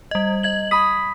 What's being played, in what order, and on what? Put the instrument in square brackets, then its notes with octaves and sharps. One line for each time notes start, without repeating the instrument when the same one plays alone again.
[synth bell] G3 D#5
D#5 G#6 F#7
[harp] B5 D#6 [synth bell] B6